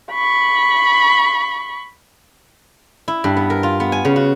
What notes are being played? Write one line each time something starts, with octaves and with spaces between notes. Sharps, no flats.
B5 C#6
E4
G2
B3
A#4
F4
B3
G#5
C#3
F#4